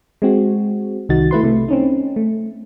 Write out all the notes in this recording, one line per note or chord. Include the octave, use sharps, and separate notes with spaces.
G#3 C4 F#4
C2 D#3 D#4 F#4 A6
A3 E4 B4 C6
C3 A3
C4 C#4 D#4
A3